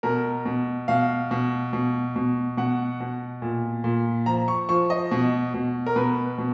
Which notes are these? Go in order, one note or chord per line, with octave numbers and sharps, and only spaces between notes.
B2 A#4
B2
B2 F5
B2
B2
B2
B2 F#5
B2
A#2
A#2
F3 A#5
C#6
F3 C#6
D#5
B2
B2
A#4
B2 B4
B2